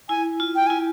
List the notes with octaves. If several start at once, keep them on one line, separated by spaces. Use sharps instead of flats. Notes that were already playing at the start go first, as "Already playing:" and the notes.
E4 G#5
F4
G5
E4 G#5